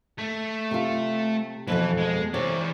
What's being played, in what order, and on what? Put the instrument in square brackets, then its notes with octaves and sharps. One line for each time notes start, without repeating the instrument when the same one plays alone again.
[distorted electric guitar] A3
[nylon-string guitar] C3 F4
[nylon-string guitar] F2 B2 A4 [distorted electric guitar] E3 B4
[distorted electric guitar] G#3
[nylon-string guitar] C3 C#5 [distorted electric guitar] E3 D5